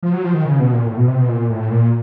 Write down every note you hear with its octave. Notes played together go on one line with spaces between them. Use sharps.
F3
F#3
F3
D#3
C#3
B2
A#2
A2
B2
C3
B2
A#2
A2
A#2